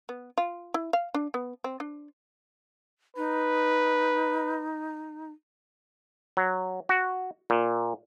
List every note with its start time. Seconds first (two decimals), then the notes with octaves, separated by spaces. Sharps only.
0.09 B3
0.38 F4
0.74 E4
0.93 F5
1.14 D4
1.34 B3
1.64 C4
1.80 D4
3.17 D#4 B4
6.37 F#3
6.89 F#4
7.50 A#2